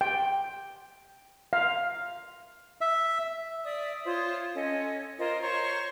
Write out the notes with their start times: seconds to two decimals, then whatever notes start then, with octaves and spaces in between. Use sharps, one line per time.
0.01 G5
1.53 F5
2.81 E5
3.64 D5 E5 D#6
4.06 F4 C5 C#5 D#6
4.55 C#4 A4 D#5
5.19 F4 A#4 C5 D#5
5.41 C5 C#5 A#5 C#6